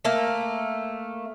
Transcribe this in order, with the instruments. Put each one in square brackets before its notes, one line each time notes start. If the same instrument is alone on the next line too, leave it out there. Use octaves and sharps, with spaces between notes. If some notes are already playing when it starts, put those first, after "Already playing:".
[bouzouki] A3 A#3